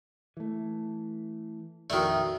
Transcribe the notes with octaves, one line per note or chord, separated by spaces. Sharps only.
E3 A3
A#1 F2 D#3 A3 F#4 D5